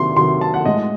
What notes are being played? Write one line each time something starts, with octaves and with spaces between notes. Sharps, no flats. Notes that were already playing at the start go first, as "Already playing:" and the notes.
Already playing: C3 D#3 F#3 C6
C3 D#3 F#3 C6
A5
F#5
A2 G#3 D#5